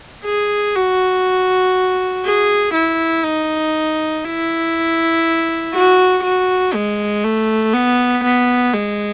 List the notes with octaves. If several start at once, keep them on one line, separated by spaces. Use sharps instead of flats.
G#4
F#4
G#4
E4
D#4
E4
F#4
F#4
G#3
A3
B3
B3
G#3